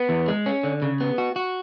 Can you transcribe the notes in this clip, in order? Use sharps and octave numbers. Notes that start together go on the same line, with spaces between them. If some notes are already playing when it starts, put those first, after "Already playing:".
Already playing: B3
E2
G#3
C#4
D3
C#3
B3
F#4
F#4